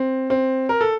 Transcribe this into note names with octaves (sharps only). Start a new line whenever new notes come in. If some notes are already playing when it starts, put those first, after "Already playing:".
Already playing: C4
C4
A#4
A4